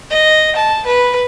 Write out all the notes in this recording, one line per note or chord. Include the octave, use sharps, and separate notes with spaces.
D#5
A5
B4